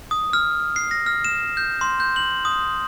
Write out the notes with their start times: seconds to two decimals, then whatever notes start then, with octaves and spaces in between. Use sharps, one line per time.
0.11 D#6
0.33 F6
0.76 C7
0.91 A#6
1.06 F6
1.24 E7
1.57 G6
1.81 C6
2.00 G6
2.16 F#7
2.45 D#6